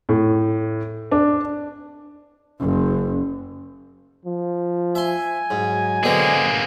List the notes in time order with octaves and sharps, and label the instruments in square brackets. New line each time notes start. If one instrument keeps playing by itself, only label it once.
[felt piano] A2
D4
[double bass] F#1 [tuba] C#4
[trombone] F3
[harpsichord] E5 C6 [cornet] G#5
[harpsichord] G#2 [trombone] F#3
[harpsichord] B2 D3 C4 [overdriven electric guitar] A#3 G#4